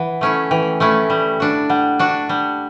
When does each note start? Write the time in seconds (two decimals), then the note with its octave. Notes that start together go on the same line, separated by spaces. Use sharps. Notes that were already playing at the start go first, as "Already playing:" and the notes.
Already playing: E3 F#5
0.21 A3 C#4 E4
0.51 E3 G5
0.80 A3 C#4 E4
1.10 G3
1.40 D4 F#4
1.70 G3 F#5
1.99 D4 F#4
2.29 G3